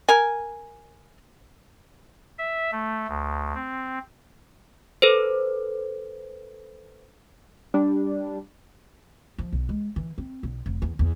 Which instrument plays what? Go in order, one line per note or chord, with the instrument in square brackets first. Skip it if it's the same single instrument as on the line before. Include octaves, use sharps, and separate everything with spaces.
[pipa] A#4 G#5
[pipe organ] E5
A3
D2
C4
[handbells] A4 B4 C5
[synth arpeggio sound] G3 D4
[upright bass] F3
B1
G#3
E3
C4
B1
F1
E2
E2